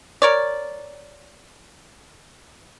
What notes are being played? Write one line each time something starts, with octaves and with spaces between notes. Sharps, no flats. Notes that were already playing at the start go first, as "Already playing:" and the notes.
A#4 C#5 D5